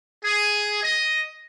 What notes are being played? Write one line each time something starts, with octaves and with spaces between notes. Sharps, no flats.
G#4
D#5